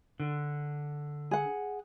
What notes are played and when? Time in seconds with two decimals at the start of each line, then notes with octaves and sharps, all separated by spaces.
0.20 D3
1.31 G#4 F#5